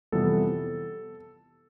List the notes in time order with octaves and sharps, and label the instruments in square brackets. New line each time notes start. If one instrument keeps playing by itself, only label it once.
[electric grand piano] F2 C3 E3 G3 B3 A4